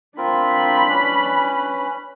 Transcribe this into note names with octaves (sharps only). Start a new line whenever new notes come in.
C4 D4 F4 A#4 B5
C#4 B4